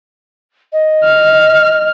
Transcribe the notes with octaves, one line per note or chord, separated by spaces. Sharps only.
D#5
F6